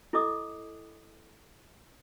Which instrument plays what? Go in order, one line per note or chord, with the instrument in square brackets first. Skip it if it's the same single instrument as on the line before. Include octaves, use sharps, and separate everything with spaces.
[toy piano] E4 A4 D#5 D6 D#6